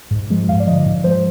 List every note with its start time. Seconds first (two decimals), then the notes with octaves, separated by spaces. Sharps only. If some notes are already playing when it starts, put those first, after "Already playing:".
0.11 G#2
0.30 F3 G#3
0.48 G2 F5
0.60 D5
0.67 D3 F3 D#5
0.86 G#2
1.04 F3 G#3 C5